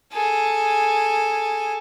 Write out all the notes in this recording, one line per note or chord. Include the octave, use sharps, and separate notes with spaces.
G#4 A4